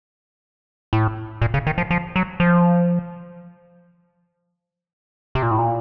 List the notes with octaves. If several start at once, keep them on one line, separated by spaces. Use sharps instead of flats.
A2
A#2
C#3
D#3
F3
F3
F#3
F3
C3
A#2
A2
A#2